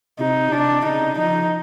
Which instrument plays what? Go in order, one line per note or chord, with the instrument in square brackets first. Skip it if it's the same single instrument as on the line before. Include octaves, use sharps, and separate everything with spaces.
[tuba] C3 [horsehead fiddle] D#4
[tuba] C3 [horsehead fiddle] D4
[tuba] C#3 [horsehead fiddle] D#4
[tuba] F3 [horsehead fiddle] D#4